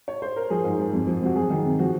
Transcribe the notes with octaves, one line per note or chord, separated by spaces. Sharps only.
C#5
C5
A#4
F3 G#4
G#2
F3
F2
F3
C3 F#4
F#3 G#4
D#3
C3
F3 F#4